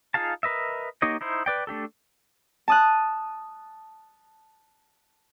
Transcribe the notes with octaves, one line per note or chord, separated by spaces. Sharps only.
D#4 F4 G#4 F5 A5
A#4 B4 D#5 E5
A#3 D#4 G4 C#5 D#5
D#4 E4 C5
B4 D5 G5
A3 D4 G4 A4
A5 D#6 F#6